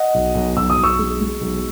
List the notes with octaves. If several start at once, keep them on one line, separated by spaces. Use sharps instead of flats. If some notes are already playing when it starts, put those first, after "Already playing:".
Already playing: D#5 F#5
B1
B1
B1 E6
D#6
B1
C#6 E6
G#3
G#3
B1